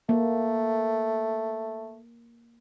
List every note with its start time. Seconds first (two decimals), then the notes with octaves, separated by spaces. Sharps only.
0.09 A3 A#3